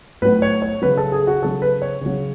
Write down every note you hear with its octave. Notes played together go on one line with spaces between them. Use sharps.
A2 F#3 B4
C#5
C#5
C#3 F#3 B4
A4
G#4
F#4
C#3 F#3 A4
B4
C#5
C#3 F#3